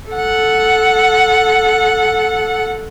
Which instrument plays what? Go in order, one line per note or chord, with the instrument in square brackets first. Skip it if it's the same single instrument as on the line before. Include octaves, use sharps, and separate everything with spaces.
[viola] A4 F#5